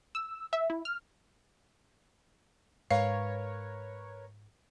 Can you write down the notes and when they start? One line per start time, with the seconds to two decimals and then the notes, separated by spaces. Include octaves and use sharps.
0.15 E6
0.53 E5
0.70 E4
0.85 F6
2.91 G#2 A#4 B4 C#5 F5